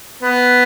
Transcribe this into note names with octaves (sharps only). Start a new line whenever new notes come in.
B3